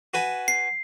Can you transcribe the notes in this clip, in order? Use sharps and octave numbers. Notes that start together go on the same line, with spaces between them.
F#4 B4 G#5
C7